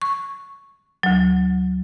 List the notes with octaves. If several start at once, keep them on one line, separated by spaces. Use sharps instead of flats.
C#6
D2 F#3